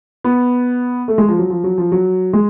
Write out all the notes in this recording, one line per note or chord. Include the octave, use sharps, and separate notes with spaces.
B3
A3
G#3
F3
F#3
F3
F#3
F3
F#3
G#3